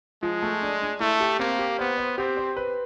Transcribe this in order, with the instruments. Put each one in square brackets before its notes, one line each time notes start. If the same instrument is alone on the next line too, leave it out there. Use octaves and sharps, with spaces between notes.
[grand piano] F3 [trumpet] G#3
[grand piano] A3
D4
D4
[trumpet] A3 [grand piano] E4
[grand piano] G4
[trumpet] A#3 [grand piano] C4
[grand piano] G4
[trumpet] B3 [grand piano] C5
[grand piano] C5
[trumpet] C4 [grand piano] G4
[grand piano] C5
B4